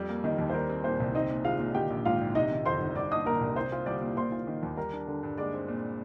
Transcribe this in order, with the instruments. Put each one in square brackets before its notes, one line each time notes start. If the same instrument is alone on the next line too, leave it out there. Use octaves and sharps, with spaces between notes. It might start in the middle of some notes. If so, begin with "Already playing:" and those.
Already playing: [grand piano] F2 G3
A#3
[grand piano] D#3 [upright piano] D#4 D#5
[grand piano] D#2
[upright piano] C5
[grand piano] G3 [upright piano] A#4
[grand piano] C4
[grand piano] A#2 [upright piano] C5
[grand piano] C2
[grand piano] C4 [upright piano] D#4 D#5
[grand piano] A#2
[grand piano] G#3 [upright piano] F4 F5
[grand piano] A#2
[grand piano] D#3 [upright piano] G4 G5
[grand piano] A#1
[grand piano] G#2 [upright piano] F4 F5
[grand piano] A#1
[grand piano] C3 [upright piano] D#4 D#5
[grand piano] D#3
[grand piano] F2 [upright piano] C5 C6
[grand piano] G1
[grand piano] G3 [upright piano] D5 D6
[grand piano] D4 [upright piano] D#5 D#6
[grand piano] A#2 [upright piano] A#4 A#5
[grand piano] C2
[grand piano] C4 [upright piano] C5 C6
[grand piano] F4
[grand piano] G3 [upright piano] D5 D6
[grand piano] A#2
[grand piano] A#3 [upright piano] C5 C6
[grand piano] F4
D#3
D#2
[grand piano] G3 [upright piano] A#4 A#5
[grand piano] D4
D3
G2
[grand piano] G#3 [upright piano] D5 D6
[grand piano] C4
A#2